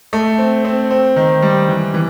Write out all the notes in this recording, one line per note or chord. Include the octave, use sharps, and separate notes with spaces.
A3
C4
C4
C4
D#3
G3
E3
E3